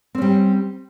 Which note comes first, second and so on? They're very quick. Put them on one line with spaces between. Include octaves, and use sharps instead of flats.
C4 C#4 G3